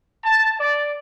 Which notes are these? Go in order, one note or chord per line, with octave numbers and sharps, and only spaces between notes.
A5
D5